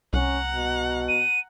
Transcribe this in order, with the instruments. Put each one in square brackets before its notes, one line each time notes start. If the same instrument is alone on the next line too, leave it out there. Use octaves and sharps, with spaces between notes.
[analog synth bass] C2 [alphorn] C#4 [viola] F#5 A#5
[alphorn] B2
[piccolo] D#7